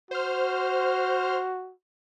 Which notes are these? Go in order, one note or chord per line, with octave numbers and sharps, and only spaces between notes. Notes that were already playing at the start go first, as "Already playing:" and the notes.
F#4 C5 F6